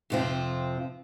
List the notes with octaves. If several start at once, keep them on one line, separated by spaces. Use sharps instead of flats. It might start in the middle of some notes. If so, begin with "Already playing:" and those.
F2 C3 F3 C4 F4